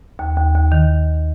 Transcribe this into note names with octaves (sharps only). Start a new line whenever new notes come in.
D#2
D#2
D#2
D#3